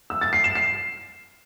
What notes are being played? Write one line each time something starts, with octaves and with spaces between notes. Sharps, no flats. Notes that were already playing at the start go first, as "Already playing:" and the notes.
E6
A6
C7
E7
C7